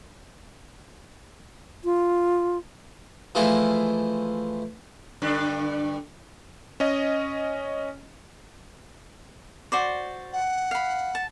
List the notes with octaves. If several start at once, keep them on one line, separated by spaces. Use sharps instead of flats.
F4
E3 F3 G#3 A3 E4 F4
G2 D3 D4
C#4 D#5
F#4 C5 D5
F#5
F5 B5
A5